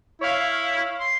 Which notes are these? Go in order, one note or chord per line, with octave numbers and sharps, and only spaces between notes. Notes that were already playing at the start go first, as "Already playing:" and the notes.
E4 C#5 F5
C6